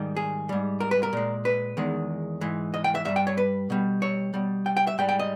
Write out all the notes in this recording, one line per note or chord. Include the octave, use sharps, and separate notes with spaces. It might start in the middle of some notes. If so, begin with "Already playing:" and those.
Already playing: G#2 D#3 G3
G#4
G#2 G3
A#4
B4
A#4
A#2 G#3
B4
E2 D#3 G#3
G#2 E3 G#3
D#5
G5
E5
G2 G3 E5
G5
C#5
B4
B2 G3
C#5
B2 G3
G5
G5
E5
G#2 G3 G5
G5
D#5